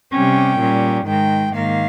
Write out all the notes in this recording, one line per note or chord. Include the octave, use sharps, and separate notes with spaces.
C3 G3 C#4 G5
A#2 G3 C#4
G#2 D#3 G#3 G5
G#2 D#3 A#3 F5